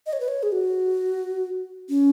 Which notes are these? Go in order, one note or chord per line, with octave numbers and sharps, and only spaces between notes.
D#5
C#5
B4
C#5
G#4
F#4
C#4